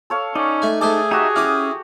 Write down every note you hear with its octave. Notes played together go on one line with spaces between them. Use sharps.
A4 C#5 F5
C#4 D#4 D5
A3 G#5
A3 G#4 A4 C5 D6
D#4 F#4 G4 E5
C#4 E4 D6 D#6 F6